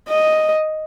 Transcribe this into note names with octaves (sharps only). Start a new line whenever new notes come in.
D#5